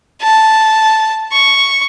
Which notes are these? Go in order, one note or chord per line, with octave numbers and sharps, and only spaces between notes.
A5
C#6